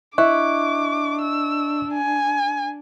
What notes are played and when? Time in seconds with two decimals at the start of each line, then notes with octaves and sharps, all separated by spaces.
0.18 D4 E4 D#5 C#6 D6 F#6
1.21 E6
1.94 G#5